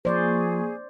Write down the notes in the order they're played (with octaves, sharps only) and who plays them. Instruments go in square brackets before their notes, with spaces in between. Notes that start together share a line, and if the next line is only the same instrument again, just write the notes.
[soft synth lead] F3 [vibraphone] A#3 C#6 [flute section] G#4 [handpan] C5 D5